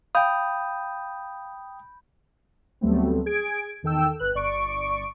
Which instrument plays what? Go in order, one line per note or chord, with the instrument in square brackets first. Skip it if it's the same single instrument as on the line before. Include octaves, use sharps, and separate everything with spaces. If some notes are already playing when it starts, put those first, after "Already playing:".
[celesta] F5 [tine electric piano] G5 D#6 [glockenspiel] B5 G6
[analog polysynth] D2 F#3 G3 A3 B3 C4
G#4 G#6 D7
E2 D#3 A4 G5 E6
G1 B4 F#6
G1 D5 C#6 D7